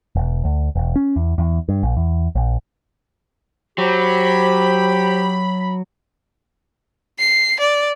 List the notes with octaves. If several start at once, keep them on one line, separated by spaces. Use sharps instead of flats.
E1
D2
E1
C#4
E2
E2
G2
A#1
E2
A#1
F#3 G4 C5 B5
C7
D5